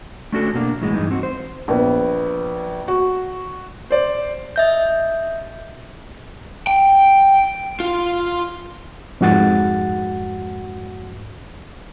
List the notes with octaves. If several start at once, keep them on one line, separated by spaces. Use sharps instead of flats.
A3 C#4 D4 F#4 G#4 A4
B2 A#3 D4
F#2 A2 E3 G#3
G2 E3 D#4
C4 F#4
C5
A#1 B3
F#4
C5 D5
D#5 E5 G6
G5
F4
F2 G#2 F#4 F#5 A6